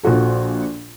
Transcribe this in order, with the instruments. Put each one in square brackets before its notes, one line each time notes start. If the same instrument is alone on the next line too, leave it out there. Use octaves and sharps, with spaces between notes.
[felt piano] A#1 F4 F#4 A4